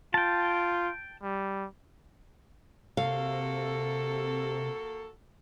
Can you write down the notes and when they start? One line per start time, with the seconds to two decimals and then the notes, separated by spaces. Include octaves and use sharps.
0.14 F4 G5 A5
1.23 G3
2.97 C3 A#3 F#4 A4 F5